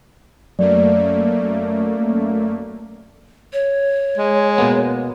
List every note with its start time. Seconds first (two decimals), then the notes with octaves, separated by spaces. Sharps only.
0.59 F#2 F#3 A3 A#3 D5
3.53 C#5
4.17 G#3
4.58 B2 A#3 B3